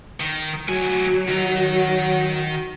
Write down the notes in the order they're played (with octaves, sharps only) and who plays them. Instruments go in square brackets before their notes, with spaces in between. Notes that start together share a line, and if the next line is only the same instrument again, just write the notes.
[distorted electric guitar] D#3
[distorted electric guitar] D2 G#5 [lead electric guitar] F#3
[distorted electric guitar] D#3 A#5 [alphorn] F#4